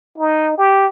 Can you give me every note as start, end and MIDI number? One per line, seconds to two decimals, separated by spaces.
0.18 0.54 63
0.57 0.86 67